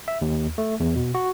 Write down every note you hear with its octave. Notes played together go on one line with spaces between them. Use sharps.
E5
D#2
A3
E2
B2
F#4